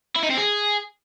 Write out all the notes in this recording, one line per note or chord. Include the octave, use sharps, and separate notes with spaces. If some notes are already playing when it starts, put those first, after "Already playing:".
E4
D#4
C4
G#4